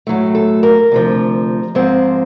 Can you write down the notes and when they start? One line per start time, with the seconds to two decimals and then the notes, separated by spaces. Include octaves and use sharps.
0.07 A2 F#3 A3
0.35 A4
0.63 A#4
0.92 D2 C3 F3
1.75 G#2 F3 G#3 C4